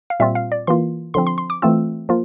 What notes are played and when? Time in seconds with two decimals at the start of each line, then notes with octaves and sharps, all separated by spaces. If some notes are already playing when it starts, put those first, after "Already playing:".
0.10 F5
0.20 A#2 G3 C4 F4 E5
0.35 F5
0.52 D5
0.67 E3 A#3 F4 C6
1.14 D3 F3 C4 C6
1.27 C6
1.38 C6
1.50 D6
1.62 E3 A3 C4 F4 E6
2.09 F3 A#3 F4